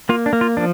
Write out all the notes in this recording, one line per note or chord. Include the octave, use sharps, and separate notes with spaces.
A#3 F4
D4
A#3
F4
F3 D4